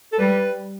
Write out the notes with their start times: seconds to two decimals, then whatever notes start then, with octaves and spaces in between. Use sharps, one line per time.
0.12 A4
0.19 G3 B4